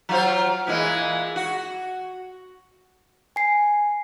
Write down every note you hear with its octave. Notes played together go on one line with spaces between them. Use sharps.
F#3 F4 C5
A#2 E3 G#3
F#4
G#5 C7